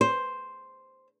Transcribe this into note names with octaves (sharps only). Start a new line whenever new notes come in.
C5